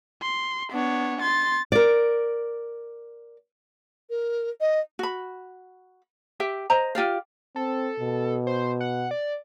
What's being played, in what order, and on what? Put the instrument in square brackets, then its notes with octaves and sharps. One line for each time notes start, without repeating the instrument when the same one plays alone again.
[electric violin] C6
[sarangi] B3 [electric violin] D4 C#5
[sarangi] C6 [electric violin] A6
[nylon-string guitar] A#4 D5
[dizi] A#4
D#5
[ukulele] F#4 B5
G4 E5 G5
C5 D#5 A#5
F4 G4 D5 F5
[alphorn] C4 [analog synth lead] A4
[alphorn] B2
[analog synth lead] C5
F#5
D5